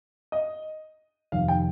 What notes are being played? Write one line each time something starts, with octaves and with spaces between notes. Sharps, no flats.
D#5
F1 F2 C3 D#3 F5
G5